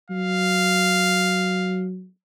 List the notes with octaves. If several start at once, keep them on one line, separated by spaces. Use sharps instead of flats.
F#3 F5